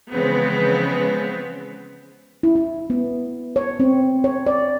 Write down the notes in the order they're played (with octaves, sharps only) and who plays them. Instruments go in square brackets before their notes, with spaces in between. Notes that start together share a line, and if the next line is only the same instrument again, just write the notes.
[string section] C#3 E3 F3 G#3 B3 C4
[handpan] E4
E4
B3
C#5
C4
C#5
D5